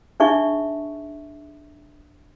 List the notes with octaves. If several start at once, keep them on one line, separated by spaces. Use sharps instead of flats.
D4 D#4 G#4 E5 C#6